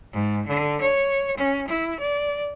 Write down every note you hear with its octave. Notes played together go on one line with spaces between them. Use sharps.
G#2
D3
C#5
C#4
E4
D5